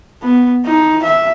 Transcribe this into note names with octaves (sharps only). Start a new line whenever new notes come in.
B3
D#4
E5